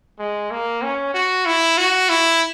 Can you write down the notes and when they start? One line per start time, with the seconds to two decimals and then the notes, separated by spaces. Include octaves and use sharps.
0.19 G#3
0.51 A#3
0.82 C#4
1.14 F#4
1.46 E4
1.77 F#4
2.09 E4